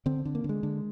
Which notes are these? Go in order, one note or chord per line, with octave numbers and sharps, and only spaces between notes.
D3 C4
D3
A#3
D3
G#3
D3